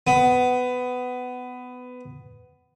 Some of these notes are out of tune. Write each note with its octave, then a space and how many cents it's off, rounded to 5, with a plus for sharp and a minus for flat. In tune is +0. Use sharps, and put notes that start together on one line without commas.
B3 +15